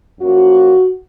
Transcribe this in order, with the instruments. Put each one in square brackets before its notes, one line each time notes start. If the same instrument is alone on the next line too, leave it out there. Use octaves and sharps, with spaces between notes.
[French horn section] F#2 F3 A#3 F#4